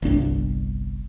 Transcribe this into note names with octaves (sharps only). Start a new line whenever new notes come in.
G1 C2 C#4 D4